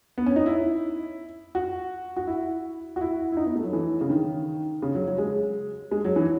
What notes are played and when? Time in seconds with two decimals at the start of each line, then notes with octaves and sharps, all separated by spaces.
0.18 B3
0.26 C#4
0.36 D#4
0.46 E4
1.55 F#4
2.17 F#4
2.27 E4
2.96 F#4
3.01 E4
3.32 E4
3.37 D#4
3.46 B3
3.56 A3
3.64 F#3
3.73 E3
4.01 C#3
4.10 D#3
4.82 C#3
4.95 F#3
5.07 F#3
5.18 G#3
5.91 G#3
6.04 F#3
6.16 E3